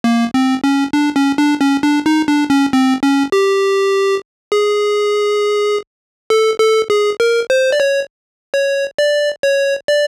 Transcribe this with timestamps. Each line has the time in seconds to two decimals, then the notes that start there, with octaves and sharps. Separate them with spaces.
0.04 A#3
0.34 C4
0.64 C#4
0.93 D4
1.16 C#4
1.38 D4
1.61 C#4
1.83 D4
2.06 D#4
2.28 D4
2.50 C#4
2.73 C4
3.03 C#4
3.32 G4
4.52 G#4
6.30 A4
6.60 A4
6.90 G#4
7.20 A#4
7.50 C5
7.72 D5
7.80 C#5
8.54 C#5
8.98 D5
9.43 C#5
9.88 D5